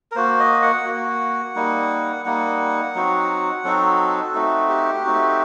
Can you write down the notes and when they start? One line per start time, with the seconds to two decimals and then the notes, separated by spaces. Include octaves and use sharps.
0.12 A#4
0.16 A#3 F#4 C5
0.40 D#5
0.62 F#5
0.86 A#3 F#4
1.55 G3 A#3 D#4
2.25 G3 A#3 D#4 F#5
2.95 F#3 C4 D#4 F#4
3.64 F#3 C4 D#4 F#4 A4
4.34 A3 C4 D#4 F#4
4.69 G4
5.05 A3 C4 D#4 F#4